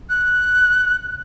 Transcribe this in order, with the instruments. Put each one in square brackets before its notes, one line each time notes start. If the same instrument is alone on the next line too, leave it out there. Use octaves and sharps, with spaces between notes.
[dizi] F#6